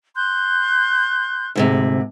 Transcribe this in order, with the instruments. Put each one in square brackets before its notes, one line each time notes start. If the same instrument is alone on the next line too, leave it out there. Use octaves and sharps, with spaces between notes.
[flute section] C6 F#6 G6
[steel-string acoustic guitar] D2 G#2 C3